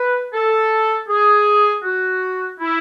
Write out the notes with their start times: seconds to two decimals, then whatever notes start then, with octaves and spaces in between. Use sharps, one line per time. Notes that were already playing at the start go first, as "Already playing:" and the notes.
Already playing: B4
0.33 A4
1.09 G#4
1.83 F#4
2.60 E4